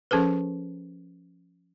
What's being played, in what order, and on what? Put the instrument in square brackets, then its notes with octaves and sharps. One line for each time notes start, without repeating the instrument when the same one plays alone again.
[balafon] F3 C#4 G#4 A4 B4